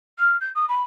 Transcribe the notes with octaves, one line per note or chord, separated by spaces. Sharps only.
F6
G6
D#6
B5